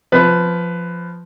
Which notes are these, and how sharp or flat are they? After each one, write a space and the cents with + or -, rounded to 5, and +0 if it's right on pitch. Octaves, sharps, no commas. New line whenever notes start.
F3 +0 B4 +15